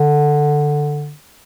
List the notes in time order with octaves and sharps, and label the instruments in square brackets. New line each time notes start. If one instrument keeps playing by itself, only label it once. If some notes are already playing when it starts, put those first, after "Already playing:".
Already playing: [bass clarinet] D3